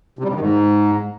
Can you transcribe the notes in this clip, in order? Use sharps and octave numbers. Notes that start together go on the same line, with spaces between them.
C3
G3
G2
D#3
G#2